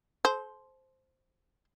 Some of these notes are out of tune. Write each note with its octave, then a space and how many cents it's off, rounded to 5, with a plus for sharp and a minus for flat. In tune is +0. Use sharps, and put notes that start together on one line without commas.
A4 -40 C5 +0